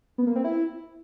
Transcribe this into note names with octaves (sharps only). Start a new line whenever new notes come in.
B3
A#3
C4
E4